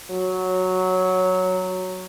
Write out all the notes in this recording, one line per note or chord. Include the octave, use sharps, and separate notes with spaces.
F#3